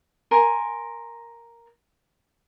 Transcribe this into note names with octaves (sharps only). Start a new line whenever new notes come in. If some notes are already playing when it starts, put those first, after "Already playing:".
A#4 G#5 C6